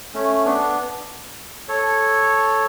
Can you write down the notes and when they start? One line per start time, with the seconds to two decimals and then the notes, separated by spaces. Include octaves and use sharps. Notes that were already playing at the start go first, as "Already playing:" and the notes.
0.14 A3 C#4
0.45 B3 D4
1.68 A4 C#5